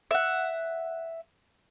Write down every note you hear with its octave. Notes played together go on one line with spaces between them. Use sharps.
E5 F#5